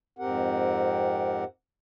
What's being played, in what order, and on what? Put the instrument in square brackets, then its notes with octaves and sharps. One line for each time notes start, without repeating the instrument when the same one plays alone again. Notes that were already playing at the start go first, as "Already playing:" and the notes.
[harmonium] F2 G#2 C4 G4 A#4 F#5